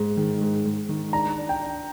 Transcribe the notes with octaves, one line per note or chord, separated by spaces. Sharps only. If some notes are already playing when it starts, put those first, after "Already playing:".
Already playing: G#2
D#3
G#2
G#2
D#3
D4 A#5
D4
G5
D4